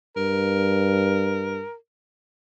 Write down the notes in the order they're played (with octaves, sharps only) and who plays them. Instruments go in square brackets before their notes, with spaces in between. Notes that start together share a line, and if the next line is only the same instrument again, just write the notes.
[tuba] G2 [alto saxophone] A#4